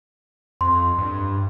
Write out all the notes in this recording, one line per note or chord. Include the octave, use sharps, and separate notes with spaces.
F2 C6
G2